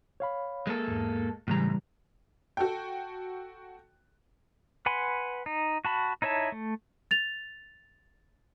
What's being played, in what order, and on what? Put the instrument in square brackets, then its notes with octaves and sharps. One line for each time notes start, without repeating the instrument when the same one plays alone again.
[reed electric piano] C#5 F5 B5
[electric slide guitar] G#3 A#3 A4
[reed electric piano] E2 G#2
[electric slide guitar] A2 G#3 A#5 [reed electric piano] C#3 E3 G3
[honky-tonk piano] F#4 A4 G5
[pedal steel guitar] B4 F#5 G#5 B5 C6
D#4
F#4 A5 B5
D#4 E4 C#5 E5 A5
A3
[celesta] A6 F7